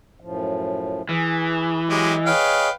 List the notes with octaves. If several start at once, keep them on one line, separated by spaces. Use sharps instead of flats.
F#2 A2 F3
E3 G#4
F#3 G#3 G4 D#5
G#4 B4 C#5 D#5 F5 G5